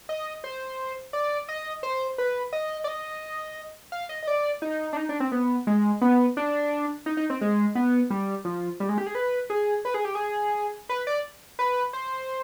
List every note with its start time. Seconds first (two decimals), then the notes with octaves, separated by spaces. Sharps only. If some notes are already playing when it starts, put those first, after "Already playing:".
0.09 D#5
0.44 C5
1.13 D5
1.49 D#5
1.83 C5
2.18 B4
2.53 D#5
2.84 D5
2.88 D#5
3.92 F5
4.09 D#5
4.23 D#5
4.28 D5
4.62 D#4
4.93 D4
4.97 D#4
5.09 D4
5.20 C4
5.32 B3
5.67 G#3
6.01 B3
6.37 D4
7.06 D#4
7.17 D#4
7.30 C4
7.41 G#3
7.75 B3
8.10 G3
8.45 F3
8.80 G3
8.89 G#3
8.98 G4
9.06 G#4
9.15 B4
9.50 G#4
9.85 B4
9.94 G#4
10.05 G4
10.15 G#4
10.89 B4
11.07 D5
11.59 B4
11.93 C5